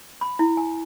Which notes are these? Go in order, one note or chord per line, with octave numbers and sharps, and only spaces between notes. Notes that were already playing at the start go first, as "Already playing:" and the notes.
B5
E4
G#5